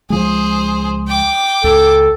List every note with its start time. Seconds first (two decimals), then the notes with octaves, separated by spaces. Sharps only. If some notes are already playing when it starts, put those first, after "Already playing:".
0.10 C#2 F3 G#3 G#4 C5
1.08 G5 D6
1.64 C#2 A4